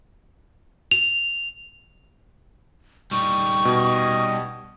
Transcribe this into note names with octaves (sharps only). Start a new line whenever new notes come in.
F7
G3 D#4 C#6
B2 D#5